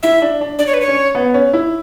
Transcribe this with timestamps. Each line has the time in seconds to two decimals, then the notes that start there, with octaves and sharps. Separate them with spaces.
0.03 E4 E5
0.22 D4
0.41 D4
0.59 D4 D5
0.67 C#5
0.74 B4
0.81 C#5
0.88 C#4
1.15 B3
1.34 C#4
1.53 E4